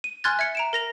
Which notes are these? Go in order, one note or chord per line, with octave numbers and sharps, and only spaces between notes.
D#7
G#5 C6 F6 F#6 G#6 A6
E5 G#6 C#7
A#5 D7 E7
A#4 A#6 F7